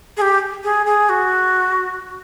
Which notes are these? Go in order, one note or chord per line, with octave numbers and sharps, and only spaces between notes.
G#4
G4
G#4
G#4
F#4